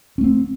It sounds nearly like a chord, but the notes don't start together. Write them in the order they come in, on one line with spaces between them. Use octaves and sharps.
C#4 A3 C4